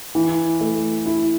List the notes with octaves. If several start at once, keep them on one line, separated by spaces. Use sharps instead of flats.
E3
A3
E4